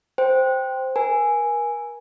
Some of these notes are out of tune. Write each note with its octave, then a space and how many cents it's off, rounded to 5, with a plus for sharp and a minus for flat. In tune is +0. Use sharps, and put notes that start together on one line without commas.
C5 +0 G5 +0
A#4 +35 G#5 +0